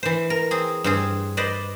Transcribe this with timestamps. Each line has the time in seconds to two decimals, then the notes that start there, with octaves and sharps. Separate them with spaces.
0.03 E3 C5
0.30 A#4
0.51 C4 G#4
0.84 G2 C4 G#4
1.37 B4 C5 D5 D#5